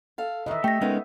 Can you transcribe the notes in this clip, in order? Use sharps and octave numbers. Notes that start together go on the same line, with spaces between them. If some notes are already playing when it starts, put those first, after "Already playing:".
A4 F5
D#3 E3 D#5 E5
A3 G4 G5 A#6
G#3 A3 B3 C#4 D#4 A#4